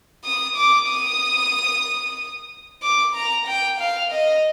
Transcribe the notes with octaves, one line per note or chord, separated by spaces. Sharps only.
D#6
D6
D#6
D6
A#5
G5
F5
D#5